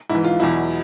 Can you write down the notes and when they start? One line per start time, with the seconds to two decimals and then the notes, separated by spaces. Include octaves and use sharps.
0.09 G#2 E4
0.15 E3
0.24 F4
0.39 E2 B2 F#3 E4